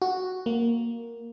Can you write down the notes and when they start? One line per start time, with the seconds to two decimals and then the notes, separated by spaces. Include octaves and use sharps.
0.02 F#4
0.46 A#3